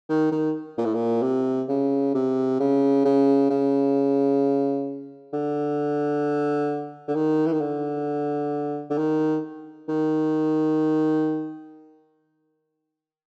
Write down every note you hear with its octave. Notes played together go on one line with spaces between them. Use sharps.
D#3
D#3
A#2
A2
A#2
C3
C#3
C3
C#3
C#3
C#3
D3
D3
D#3
E3
D#3
D3
D3
D#3
D#3